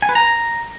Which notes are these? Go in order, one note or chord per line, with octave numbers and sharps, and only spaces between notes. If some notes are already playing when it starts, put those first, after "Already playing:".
G#5
B4
A#5